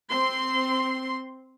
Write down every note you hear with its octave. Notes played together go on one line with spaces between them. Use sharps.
C4 C6